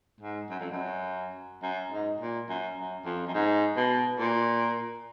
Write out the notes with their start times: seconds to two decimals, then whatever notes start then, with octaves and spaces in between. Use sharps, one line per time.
0.21 G#2
0.50 F#2
0.60 F2
0.71 F#2
1.62 F#2
1.91 G#2
2.20 A#2
2.49 F#2
2.77 F#2
3.05 F2
3.27 F#2
3.34 G#2
3.77 B2
4.19 A#2